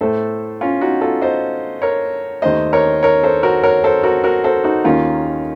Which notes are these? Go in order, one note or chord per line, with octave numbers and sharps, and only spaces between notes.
A2 A3 A4 C5
C#4 F4
D#4 F#4
F4 A4
C5 D#5
A#4 C#5
D#2 D#3 A3 C5 D#5
A#4 C#5
A#4 C#5
A4 C5
F#4 A#4
A#4 C#5
A4 C5
F#4 A#4
F#4 A#4
A4 C5
D#4 F#4
D#2 D#3 A#3 C#4 F4